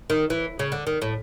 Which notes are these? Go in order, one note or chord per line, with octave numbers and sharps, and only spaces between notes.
D#3
E3
C#3
D3
D#3
A2